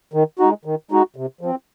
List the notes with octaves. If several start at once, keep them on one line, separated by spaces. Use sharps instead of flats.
D#3
G#3 D#4 F#4
D#3
G#3 D#4 F#4
C3
F3 C4